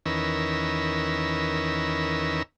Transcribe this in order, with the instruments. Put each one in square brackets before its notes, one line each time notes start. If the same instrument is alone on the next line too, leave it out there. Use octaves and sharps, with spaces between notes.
[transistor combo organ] E2 D#3 C#4 A#4 B4 E6